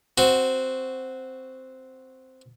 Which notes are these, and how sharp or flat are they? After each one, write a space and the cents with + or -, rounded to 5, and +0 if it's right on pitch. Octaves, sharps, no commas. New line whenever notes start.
C4 -5 F#4 +0